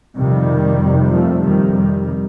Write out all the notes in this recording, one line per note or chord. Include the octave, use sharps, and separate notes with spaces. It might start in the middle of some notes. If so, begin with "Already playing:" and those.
F2 C3 D#3 G3
F2 C3
F3 A3
F2 C3 D#3 G3
D#3 G3